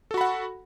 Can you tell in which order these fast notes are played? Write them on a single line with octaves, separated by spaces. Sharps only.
A4 F#4 B5 F#5